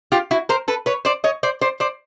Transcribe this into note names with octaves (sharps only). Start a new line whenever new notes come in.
F4 G4
E4 F#4
A#4 C5
A4 B4
B4 C#5
C5 D5
C#5 D#5
C5 D5
C5 D5
C5 D5